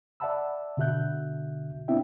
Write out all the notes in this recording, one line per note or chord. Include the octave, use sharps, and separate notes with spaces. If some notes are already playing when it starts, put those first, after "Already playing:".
D5 E5 F#5 A5 B5 E6
B2 D3 F#4 E5 F#6 G6
B3 C4 D4 E4 E5 G5